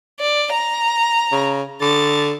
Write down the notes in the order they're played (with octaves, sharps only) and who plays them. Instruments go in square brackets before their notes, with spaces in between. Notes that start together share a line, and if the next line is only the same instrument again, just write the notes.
[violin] D5
A#5
[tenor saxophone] C#3
[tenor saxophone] D3 [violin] A6